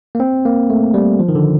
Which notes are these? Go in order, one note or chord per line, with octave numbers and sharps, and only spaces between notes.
A#3
C4
A#3
A3
G3
F3
D#3
D3